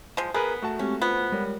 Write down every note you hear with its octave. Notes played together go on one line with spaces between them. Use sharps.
F3 G#3
B3 G#4 A#4 B4
A3 F#4 A5
G#3 C4 C#4 G4
B3 F4 C5 F#6
G3 G#3 A#4 C#5